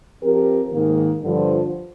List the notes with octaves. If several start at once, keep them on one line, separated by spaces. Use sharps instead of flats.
F3 C4 G4 A#4
G#2 D#3 A#3
G2 D3 F3